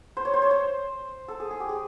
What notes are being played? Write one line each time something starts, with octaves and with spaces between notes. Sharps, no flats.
C5
C#5
C5
C#5
C5
A4
G#4
G#4
G4
G#4